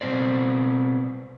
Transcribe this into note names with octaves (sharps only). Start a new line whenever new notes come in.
B2 D#3 C4 C5 D5